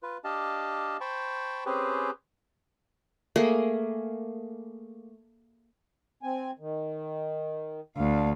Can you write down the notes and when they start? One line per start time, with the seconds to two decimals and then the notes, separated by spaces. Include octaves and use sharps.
0.03 F4 B4
0.24 D4 G4 D#5 F5 A5
1.01 C5 G5 A5 B5 C#6
1.66 C4 C#4 G4 G#4 B4 C5
3.36 A3 A#3 G#4
6.23 C4 G#5
6.59 D#3
7.97 D2 D4 F5